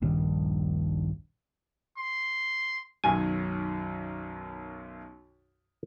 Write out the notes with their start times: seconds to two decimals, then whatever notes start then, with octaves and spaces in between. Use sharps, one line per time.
0.02 D#1 A#1 G2 D#3
1.98 C6
3.04 B1 F#2 D#3 G#5